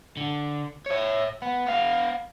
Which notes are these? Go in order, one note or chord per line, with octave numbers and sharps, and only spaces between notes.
D3
C#5 E5
B3
B3 F5